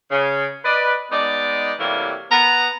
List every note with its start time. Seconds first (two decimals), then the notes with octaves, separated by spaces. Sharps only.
0.11 C#3
0.64 B4 D5 D#5
1.11 G#3 B3 D#4 D5
1.79 C3 E3 F#3 G3 A3 A#3
2.31 B3 A#5